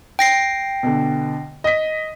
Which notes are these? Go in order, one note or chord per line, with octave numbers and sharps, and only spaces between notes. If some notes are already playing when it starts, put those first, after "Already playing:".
G5 A#6 C7
B2 D3
D#5 B6